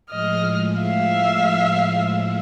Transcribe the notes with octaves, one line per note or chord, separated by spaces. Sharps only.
A2 F3 G#3 D#5 F6
E5 F5